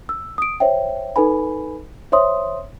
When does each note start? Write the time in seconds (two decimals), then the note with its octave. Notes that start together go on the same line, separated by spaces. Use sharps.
0.09 E6
0.38 D#6 D7
0.60 C5 C#5 E5 G5
1.16 D#4 A4 B4 G#5 B5
2.12 C5 C#5 E5 C6 D#6